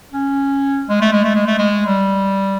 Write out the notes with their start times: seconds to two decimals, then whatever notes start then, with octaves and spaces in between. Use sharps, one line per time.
0.12 C#4
0.89 G#3
1.01 A3
1.12 G#3
1.24 A3
1.35 G#3
1.47 A3
1.58 G#3
1.86 G3